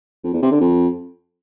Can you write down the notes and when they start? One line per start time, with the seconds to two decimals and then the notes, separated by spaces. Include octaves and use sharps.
0.24 F2
0.33 E2
0.42 C3
0.51 D3
0.60 F2